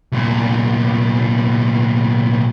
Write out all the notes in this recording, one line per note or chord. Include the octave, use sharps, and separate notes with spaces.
C2 A#2